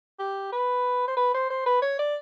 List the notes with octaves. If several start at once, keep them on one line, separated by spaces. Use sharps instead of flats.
G4
B4
C5
B4
C5
C5
B4
C#5
D5